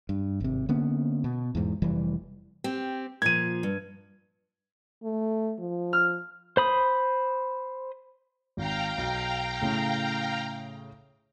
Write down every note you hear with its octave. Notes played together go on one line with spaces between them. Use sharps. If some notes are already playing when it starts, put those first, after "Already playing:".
G2
G#1 C3
D3 A#3 B3 C#4
B2
E2 G#2
F1 E3 G3
C4 G4
A#2 F3 G#6 D#7
G2
A3
F3
F6
C5 B5 D#6
G#1 F5 G5 A#5
B1
A2 C#3